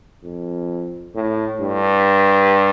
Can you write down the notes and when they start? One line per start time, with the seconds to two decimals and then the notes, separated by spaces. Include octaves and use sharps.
0.24 F2
1.15 A2
1.61 G2